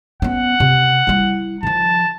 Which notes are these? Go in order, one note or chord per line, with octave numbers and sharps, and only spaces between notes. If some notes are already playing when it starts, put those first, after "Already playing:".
B3 C#4 F#5
C3
G3 E4
D#3 F3 A5